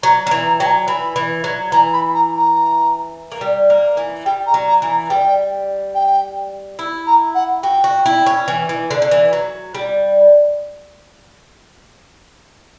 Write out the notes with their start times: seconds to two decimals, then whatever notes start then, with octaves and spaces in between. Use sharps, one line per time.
0.03 F#3 A#5
0.25 F#3 A#5
0.31 E3
0.46 A#5
0.59 F#3 G5
0.67 A#5
0.88 E3 B5
1.16 E3
1.44 F#3
1.72 E3 A#5
1.93 B5
2.14 A#5
2.35 A#5
3.32 A#3
3.41 G3
3.70 A#3
3.97 E3
4.25 G3 G5
4.47 A#5
4.54 F#3
4.68 A#5
4.82 E3
4.89 A#5
5.10 G3 G5
5.95 G5
6.79 E4
7.07 A#5
7.35 F#5
7.63 F#4 G5
7.84 F#4
8.06 E4
8.26 C#4
8.48 E3
8.69 E3
8.91 D3
9.02 D3
9.11 E3
9.33 F#3
9.75 G3